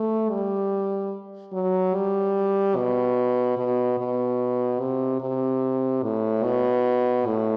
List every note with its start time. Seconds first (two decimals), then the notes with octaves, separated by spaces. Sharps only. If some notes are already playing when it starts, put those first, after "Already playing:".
Already playing: A3
0.30 G3
1.53 F#3
1.94 G3
2.76 B2
3.57 B2
3.99 B2
4.80 C3
5.21 C3
6.03 A2
6.44 B2
7.26 A2